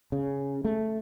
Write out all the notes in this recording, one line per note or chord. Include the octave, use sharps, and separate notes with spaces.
C#3
A3